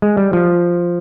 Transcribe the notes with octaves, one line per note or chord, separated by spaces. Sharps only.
G#3
G3
F3